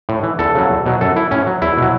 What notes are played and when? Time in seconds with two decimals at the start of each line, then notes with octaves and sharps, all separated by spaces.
0.09 A2
0.23 E3
0.39 E2 A4
0.55 C#3 F#3
0.70 E2
0.86 B2 F#3
1.01 F#2 A4
1.16 E3 E4
1.31 A2 C#4
1.47 F#3
1.62 E2 E4
1.77 B2
1.82 F#3